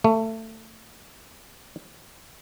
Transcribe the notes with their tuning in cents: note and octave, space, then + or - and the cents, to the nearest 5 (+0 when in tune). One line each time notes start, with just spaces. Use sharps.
A3 +20